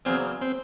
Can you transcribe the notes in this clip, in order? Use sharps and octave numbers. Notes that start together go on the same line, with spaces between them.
E2 C#3 F#3 A#3 C4
C4